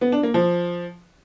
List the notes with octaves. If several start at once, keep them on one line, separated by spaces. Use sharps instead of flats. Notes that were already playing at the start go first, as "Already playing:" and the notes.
B3
D4
A#3
F3